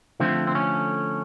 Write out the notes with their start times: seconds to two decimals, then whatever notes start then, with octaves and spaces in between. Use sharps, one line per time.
0.20 D3 F3 A3 C4
0.47 C4
0.55 C#4